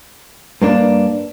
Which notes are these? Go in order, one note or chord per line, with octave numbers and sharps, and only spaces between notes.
G2 A#3 D4